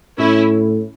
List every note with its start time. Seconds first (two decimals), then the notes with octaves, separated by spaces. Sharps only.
0.18 A2 C#4 E4